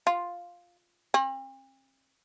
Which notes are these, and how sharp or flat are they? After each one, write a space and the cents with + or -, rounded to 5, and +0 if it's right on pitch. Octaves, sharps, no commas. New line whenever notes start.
F4 +5
C4 +45